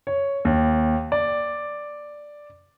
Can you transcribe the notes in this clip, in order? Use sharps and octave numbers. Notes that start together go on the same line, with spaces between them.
C#5
D#2
D5